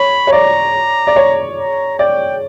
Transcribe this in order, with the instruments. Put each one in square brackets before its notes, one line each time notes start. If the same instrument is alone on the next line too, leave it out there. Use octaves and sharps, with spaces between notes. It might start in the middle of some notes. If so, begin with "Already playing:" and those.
Already playing: [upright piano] C#5 [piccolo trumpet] B5
[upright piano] C#5
[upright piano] D5 [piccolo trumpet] A#5
[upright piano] D5
C#5
[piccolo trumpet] A#5
[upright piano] D5 [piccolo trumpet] G5